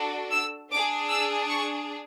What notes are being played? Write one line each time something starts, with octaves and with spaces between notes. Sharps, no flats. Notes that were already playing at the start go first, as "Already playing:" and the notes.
Already playing: D4 F#4 A4
E6
D4 G#4 D6
E6
C#6